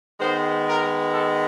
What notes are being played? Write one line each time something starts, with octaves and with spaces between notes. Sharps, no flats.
D#3 G#3 B3 C5
A#4
A4